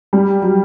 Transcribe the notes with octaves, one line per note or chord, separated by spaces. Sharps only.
G3
F#3